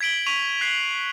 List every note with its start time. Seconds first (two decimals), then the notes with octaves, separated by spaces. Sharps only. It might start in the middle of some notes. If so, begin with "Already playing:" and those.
0.01 G#6 B6 D7 F#7 G7
0.27 C#6 B6 D#7 F7
0.61 F#6 G#6 B6 C7 F#7